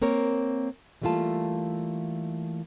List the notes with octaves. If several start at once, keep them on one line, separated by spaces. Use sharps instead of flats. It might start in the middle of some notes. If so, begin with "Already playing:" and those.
A#3 C4 A#4 C#5
E3 G3 A3 A#3 F4 A5